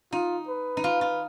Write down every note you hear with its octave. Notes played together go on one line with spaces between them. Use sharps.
D#4 F4
B4
D#4
F4
F4